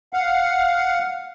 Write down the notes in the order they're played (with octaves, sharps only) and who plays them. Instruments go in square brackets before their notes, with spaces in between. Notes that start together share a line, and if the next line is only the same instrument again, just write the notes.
[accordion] F5 F#5